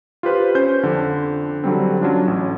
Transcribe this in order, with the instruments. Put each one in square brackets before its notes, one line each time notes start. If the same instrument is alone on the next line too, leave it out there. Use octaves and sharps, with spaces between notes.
[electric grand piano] F4 G4 B4 C5
C#4 C5 G6
F2 D3 F3
D3 F#3 G3 C4
F#3 C#4 D4 F4
A1